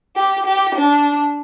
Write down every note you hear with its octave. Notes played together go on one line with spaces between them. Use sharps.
G4
G4
D4